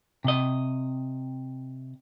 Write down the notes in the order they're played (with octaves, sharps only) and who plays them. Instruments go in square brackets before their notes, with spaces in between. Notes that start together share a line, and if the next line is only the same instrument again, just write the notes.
[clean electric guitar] C3 D#5